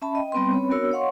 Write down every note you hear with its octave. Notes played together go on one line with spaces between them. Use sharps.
C#4 E5 A5 B5
D#5 G5
G3 B3 C4 B4 C6
C4 C#4 B4 C#5 B5
B3 D4 F#4 A#4 C#5 E6
C#5 D#5 F5 F#5 C6 C#6